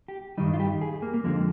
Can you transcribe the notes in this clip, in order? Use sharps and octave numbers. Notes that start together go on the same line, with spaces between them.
G4
G2 D#3 G3 D#4
F4
G4
G#4
A#3
A#3
F2 D3 F3 G#3